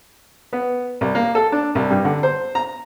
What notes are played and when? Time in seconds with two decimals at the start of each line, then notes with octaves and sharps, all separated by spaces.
0.53 B3
1.01 C2
1.15 A#3
1.35 A4
1.52 D4
1.75 C2
1.90 G2
2.05 D3
2.23 C5
2.55 A#5